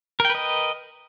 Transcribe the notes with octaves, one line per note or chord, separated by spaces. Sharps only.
A#4 B4 D#5 G5